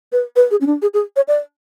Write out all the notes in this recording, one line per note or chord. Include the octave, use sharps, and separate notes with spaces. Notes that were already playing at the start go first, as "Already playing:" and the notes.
B4
B4
G#4
C#4
D4
G#4
G#4
C#5
D5